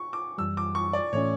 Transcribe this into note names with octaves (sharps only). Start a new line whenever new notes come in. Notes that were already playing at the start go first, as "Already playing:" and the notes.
Already playing: C#6
D6
F#2 E3 G3 E6
D6
C#6
D5
A2 E3 A3 C#4 C#5